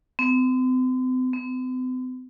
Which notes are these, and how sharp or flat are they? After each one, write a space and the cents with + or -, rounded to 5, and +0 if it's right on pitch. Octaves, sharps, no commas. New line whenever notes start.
C4 -40
C4 -45